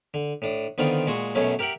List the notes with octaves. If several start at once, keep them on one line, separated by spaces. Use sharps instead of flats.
D3
A2 D4 D#6
D3 D#3 B3 C4 D4 F4
A#2 G#3 F#4 C6 C#6 D#6
F#2 B2 F#3 A3 C#4
G4 A#4 E5 F#5 G5